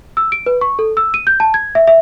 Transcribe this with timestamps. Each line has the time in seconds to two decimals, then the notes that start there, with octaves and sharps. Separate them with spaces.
0.17 E6
0.32 D7
0.46 B4
0.61 C#6
0.79 A4
0.97 E6
1.14 D#7
1.27 G6
1.40 A5
1.54 G#6
1.75 E5
1.87 E5